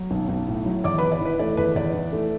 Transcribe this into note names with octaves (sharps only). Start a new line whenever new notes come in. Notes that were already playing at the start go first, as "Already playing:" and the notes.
Already playing: F#3
B1
B1
A2
F#3
E2 D5 D6
E2 B4 B5
D5
E3 B4
A3 D5
E2 B4
E2 D5
E3
A3